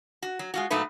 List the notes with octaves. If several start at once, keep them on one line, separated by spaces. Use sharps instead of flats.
F#4
F#3
G#3 F4 F#4
A#2 F#3 A3 D#4 B4